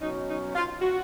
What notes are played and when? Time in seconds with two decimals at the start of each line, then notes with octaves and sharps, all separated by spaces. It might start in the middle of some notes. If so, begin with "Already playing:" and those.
0.02 B2 F#3 C#4 D#4
0.29 D#4
0.55 F4
0.82 F#4